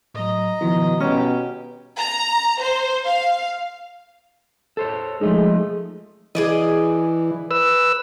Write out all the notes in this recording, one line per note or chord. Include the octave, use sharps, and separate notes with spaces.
A2 F#3 D#5 A#5
B2 D#3 F3 E4
B2 C#4 G4 A#5
A#5
C5
F5
A4 C5 C#5
F3 G#3 A3 D#4
E3 G#4 D5 D#5
B4 E6